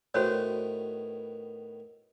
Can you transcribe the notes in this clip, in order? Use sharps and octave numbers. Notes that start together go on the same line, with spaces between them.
A2 D#3 B3 F#4 C5 C#5